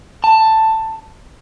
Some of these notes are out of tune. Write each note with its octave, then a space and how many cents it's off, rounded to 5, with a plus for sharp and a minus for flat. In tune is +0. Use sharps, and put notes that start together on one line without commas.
A5 +10